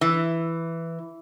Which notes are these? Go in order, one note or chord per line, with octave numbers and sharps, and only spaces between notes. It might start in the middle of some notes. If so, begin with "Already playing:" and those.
E3